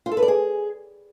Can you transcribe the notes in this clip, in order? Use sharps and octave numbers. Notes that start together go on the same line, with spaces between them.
F4
A4
B4
D5
G#4